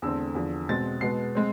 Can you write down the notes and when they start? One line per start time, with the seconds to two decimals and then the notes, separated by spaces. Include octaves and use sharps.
0.02 E2 D3 A3 C4 E6
0.35 E2 D3 F3
0.69 B2 G#3 C4 A6
1.01 B2 G#3 B3 C7
1.35 G#3 C4